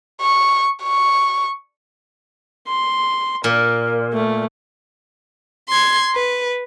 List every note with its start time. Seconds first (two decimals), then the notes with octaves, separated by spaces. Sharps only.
0.22 C#6
0.83 C#6
2.67 C6
3.44 A#2 A#4
4.13 A3
5.69 C6 G#6
6.14 B4